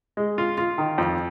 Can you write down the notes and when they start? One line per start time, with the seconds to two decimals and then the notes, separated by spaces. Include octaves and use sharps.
0.17 G#3
0.38 F4
0.58 F4
0.78 D#3
0.98 F2